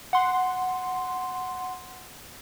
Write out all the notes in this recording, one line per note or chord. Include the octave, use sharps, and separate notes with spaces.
F#5 C6